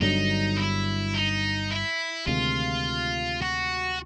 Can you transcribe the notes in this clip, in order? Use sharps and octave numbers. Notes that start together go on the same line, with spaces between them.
G1 G2 D3 F#3 D#4
E4
D#4
E4
D2 C3 D#3 G#3 F4
F#4